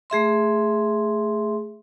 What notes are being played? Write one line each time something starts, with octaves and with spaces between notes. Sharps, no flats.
A3 G#4 E5 C6